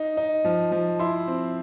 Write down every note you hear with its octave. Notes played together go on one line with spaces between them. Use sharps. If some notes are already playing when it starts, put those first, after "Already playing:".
Already playing: D#4
D#4
F3
F3
E4 C6
C4